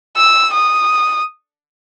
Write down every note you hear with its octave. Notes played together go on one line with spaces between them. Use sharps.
E6
D#6